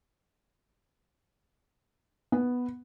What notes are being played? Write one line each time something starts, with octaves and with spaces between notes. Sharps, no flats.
B3